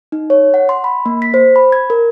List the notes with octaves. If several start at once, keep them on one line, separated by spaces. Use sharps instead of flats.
D#4
C#5
F#5
C6
B5
A#3
B6
C5
B5
G#6
A#4